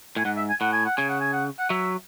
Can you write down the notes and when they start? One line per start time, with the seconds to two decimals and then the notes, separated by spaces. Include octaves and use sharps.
0.16 A2 G#5
0.25 G#2 F#5
0.37 E5
0.49 G#5
0.61 A2 F#5
0.72 G#5
0.85 F#5
0.97 C#3 G#5
1.09 F#5
1.20 G#5
1.33 F#5
1.58 F#5
1.70 F#3 E5